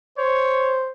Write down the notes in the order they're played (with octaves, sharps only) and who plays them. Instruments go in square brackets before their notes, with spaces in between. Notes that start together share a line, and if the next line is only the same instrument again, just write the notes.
[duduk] C5 [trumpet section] C#5